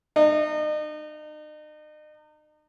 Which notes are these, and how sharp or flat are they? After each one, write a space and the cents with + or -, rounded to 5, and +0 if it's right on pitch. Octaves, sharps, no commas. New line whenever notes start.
D#4 -40